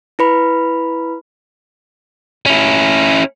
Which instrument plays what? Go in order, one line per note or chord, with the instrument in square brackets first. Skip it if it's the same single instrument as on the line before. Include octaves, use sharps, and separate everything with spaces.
[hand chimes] E4 B4 B5
[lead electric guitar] C#4 E4